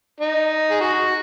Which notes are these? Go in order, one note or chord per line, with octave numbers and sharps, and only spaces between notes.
D#4
G#4
F#4